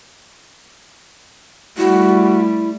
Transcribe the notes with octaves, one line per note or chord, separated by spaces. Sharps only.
G3 A3 E4 F#4